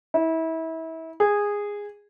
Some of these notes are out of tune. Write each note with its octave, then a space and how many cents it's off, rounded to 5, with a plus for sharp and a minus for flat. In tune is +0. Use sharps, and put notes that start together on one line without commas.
E4 -30
G#4 -15